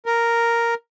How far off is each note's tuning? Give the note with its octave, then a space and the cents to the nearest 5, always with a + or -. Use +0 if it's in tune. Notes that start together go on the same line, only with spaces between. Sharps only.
A#4 +0